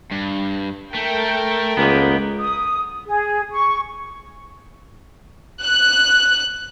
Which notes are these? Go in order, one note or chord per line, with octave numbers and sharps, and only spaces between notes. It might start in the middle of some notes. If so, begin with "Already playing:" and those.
G2
A3 A4 A#4 G5
C#2 G#3 A#3 B3
D#6
G#4
C#6
F#6